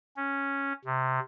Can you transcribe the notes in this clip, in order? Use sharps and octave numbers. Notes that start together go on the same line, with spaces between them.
C#4
C3